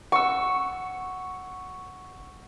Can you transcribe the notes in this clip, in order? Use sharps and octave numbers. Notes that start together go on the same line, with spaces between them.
F#5 C#6 E6